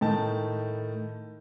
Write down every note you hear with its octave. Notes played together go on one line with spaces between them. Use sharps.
A2 D#3 A5